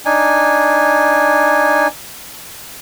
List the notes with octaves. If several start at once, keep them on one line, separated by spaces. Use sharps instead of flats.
D4 D#4 G#5